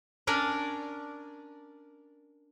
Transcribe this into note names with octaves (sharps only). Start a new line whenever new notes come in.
C#4 D4 A#4 D5